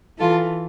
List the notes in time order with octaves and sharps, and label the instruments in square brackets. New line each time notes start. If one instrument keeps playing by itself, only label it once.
[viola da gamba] E3 [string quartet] F4 A4